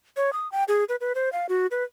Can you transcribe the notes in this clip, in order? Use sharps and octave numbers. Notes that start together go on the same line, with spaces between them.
C#5
D#6
G5
G#4
B4
B4
C5
F5
F#4
B4